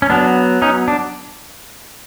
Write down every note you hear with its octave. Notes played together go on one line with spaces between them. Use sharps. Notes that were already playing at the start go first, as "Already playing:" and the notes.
C#4
F#3 B3 D4
C#4 D#4
D4